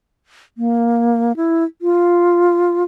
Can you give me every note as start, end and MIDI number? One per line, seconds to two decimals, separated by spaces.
0.58 1.32 58
1.36 1.64 64
1.82 2.83 65